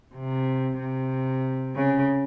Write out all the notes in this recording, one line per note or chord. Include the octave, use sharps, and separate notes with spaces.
C3
C3
C#3